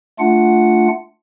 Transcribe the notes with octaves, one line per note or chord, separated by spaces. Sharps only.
A3 D4 F4 F#5